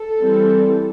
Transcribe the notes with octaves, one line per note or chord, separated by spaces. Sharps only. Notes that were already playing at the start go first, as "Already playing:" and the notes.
Already playing: A4
E3 G3 C4